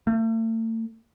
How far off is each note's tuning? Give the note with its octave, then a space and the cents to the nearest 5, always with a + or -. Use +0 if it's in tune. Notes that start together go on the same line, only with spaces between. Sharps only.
A3 +40